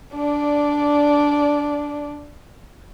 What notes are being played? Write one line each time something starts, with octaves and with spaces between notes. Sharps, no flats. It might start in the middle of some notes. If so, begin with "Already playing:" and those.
D4 D5